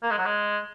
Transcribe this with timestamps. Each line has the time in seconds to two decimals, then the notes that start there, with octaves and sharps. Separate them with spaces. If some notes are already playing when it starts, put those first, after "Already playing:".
0.03 A#3
0.11 G#3
0.18 F#3
0.25 G#3